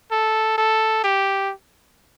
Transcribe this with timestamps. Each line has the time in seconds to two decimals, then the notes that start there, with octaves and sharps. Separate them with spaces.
0.11 A4
0.58 A4
1.04 G4